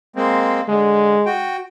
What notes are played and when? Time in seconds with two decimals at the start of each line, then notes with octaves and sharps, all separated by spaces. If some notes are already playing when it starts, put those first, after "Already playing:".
0.16 G#3 A#3 C4
0.69 D3 G#3
1.26 F#4 G5